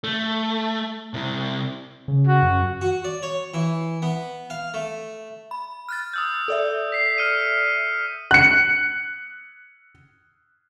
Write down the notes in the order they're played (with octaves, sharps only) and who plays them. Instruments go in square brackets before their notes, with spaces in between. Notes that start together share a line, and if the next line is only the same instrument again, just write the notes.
[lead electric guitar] A3
C3 E4
[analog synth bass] C#3
[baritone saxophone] F#4
[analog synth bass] F#2
[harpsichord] F#4
D5
C#5
E3
B3
F5
A3
[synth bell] B5
F6 F#6 A6
[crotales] D#6 E6 G6
[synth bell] A4 D5 E5
[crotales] B6 C7
F6 C#7 D#7
[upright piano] F#6 C#7